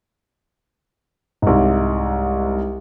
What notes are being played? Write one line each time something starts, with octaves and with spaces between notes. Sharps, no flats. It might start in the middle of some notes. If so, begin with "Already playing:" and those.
C2 G#2